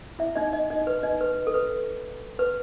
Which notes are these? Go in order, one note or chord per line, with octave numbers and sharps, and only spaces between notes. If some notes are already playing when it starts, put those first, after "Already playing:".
E4 E5
D#4 D#5
D#4 D#5
D#4 D#5
B4
D#4 D#5
B4
A4
B4
B4